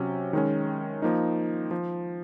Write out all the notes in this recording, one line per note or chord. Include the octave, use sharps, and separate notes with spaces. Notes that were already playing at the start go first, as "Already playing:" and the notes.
Already playing: C3 F#3 C#4
D#3 G#3 C#4
F3 A#3 D#4
F3